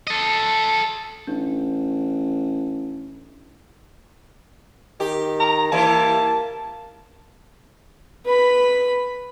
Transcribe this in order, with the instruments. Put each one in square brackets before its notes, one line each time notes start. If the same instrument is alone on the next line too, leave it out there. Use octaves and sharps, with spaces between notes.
[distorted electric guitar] A4 D#5
[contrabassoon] A1 [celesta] D4
[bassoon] D#3 [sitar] G4
[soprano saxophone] A#5
[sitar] E3 G3 E4 [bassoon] A#3 [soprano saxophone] A5
[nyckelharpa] B4 B5